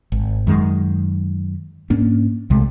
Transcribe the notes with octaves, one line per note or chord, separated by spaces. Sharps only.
G#1
F#2 D#3 G#3
G#2 A#3 C#4 D4
C2 C3 G#3 A3